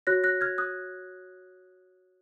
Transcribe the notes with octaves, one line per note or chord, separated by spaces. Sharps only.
F#4 C#5 F#6 A#6
F#6 A#6
F6 G#6
D#6 F#6